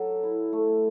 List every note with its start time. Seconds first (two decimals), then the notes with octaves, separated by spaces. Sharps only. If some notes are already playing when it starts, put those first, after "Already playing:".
Already playing: F#3 A4
0.23 E4
0.53 A3